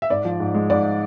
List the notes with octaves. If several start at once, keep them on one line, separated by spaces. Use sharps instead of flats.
E5
G#2 D5
F3
G#2
G#3
G#2 D5